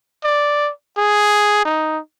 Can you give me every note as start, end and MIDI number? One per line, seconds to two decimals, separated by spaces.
0.24 0.71 74
0.97 1.62 68
1.65 1.99 63